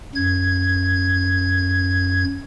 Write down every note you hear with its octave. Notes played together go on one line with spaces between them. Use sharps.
F#2 G#6